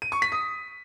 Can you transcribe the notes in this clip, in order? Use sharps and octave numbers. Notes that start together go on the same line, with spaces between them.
D#7
C#6
B6
D#6